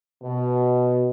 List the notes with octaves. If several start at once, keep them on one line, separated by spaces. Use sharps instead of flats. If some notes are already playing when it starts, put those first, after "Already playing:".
B2